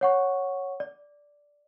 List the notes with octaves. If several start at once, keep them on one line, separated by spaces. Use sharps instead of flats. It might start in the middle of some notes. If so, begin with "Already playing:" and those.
C#5 F#5 C#6
D5